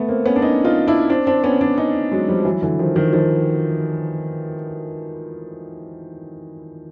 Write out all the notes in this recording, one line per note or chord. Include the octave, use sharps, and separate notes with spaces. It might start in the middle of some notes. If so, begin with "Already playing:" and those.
Already playing: A3 B3
A#3 C4
B3 C#4
D4
C#4 D#4
D#4 F4
D4 E4
C4 D4
C4 D4
B3 C#4
C4 D4
C#4 D#4
F#3 G#3
F3 G3
E3 F#3
D3 E3
D#3 F3
D#3 F3
D#3 F3